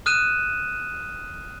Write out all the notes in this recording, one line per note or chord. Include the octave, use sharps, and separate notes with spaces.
D#6 F6 F#6 D#7 E7